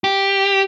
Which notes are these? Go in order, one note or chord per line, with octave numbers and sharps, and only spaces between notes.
G4